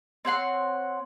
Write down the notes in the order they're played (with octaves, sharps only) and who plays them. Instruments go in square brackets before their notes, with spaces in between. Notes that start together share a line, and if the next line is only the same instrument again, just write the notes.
[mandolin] C4 C#5 F#5 C6